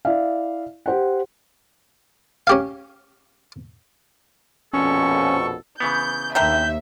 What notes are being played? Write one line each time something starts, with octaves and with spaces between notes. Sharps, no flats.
E4 D5 E5 F5
G4 C5 F#5
C#4 G4 F5
A#1 F2 B2 C#4 A4 C#6
C#3 E3 B3 G6
D#2 D3 A#4 E5 G5 G6